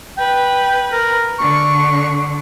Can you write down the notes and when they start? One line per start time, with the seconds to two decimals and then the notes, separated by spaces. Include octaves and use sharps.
0.18 B4 G5
0.92 A#4
1.39 D3 C#6